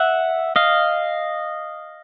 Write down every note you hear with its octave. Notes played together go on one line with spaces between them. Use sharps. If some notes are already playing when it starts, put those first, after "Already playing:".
Already playing: E5 F#5
D#5 F5